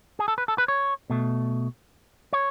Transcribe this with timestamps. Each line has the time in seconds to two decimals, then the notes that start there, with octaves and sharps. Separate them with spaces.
0.19 G#4
0.28 A4
0.38 B4
0.48 A4
0.58 B4
0.68 C#5
1.10 B2 A3
2.33 C#5